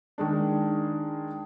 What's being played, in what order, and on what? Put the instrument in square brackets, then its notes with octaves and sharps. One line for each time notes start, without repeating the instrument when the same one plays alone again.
[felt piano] D#3 G#3 D4